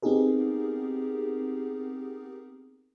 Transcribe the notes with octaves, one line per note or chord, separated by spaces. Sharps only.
B3 C4 D#4 G4 G#4 A#4